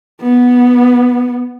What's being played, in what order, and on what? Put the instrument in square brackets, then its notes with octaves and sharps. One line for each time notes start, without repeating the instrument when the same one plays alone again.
[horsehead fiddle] B3